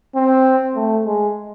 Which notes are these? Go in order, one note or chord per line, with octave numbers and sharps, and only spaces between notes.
C4
A3
G#3